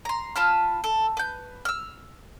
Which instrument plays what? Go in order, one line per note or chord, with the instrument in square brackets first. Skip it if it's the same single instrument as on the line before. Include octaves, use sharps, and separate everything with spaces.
[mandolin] A#5 C6
F4 A5 B5 F6
A4
B4 G6
E6 F6